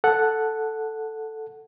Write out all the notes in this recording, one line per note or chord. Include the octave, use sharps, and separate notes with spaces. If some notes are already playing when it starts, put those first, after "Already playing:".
A4 F#5